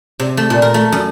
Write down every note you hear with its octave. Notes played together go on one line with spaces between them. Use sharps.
C3
A3
A#2
A#4
A3
F#2